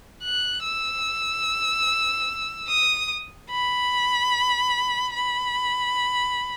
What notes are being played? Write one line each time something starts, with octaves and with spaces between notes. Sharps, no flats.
F#6
E6
D#6
B5
B5